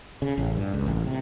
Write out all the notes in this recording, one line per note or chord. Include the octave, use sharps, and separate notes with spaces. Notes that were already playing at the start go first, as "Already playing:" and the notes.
C#3
A1
G2
C#2
A1
C3